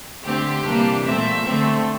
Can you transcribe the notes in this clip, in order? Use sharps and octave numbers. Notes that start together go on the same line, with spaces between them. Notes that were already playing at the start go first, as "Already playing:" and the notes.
D3 A3 C4 G4
C3 E3 G3 A#3 D4
A#2 A3 C4 E5
D3 A3 C4